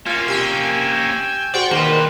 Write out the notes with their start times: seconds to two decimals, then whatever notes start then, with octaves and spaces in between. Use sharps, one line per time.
0.06 A#3 C#4 F4 F5
0.28 C3 G5 G#5 E6
1.54 G#3 F#4 C5 D5 G5 C#6
1.71 D#3 G3 A#3 B4 C5